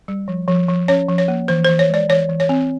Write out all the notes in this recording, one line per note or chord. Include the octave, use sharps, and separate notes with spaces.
G3
F3
F3
F3
C#4 C#5
F3
C#5
A#3
E3 C5
E3 C5
C#5
G#3 D5
E3 C#5
E3
C#5
C4